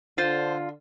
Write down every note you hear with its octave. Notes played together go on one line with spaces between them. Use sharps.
D3 F4 C5